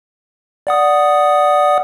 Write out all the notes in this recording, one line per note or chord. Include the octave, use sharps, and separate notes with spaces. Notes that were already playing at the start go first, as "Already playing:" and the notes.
D5 F#5 D#6